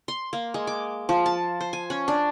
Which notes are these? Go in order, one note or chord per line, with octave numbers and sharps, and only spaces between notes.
C6
A#3
G#3
D6
F3
A5
C5
G#5
C#4
D4